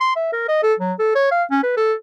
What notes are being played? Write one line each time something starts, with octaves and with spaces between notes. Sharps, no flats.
C6
E5
A#4
D#5
A4
F#3
A4
C#5
F5
C#4
B4
A4